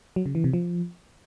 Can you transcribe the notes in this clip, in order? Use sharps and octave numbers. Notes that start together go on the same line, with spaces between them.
F#3
C#3
E3
C3
F3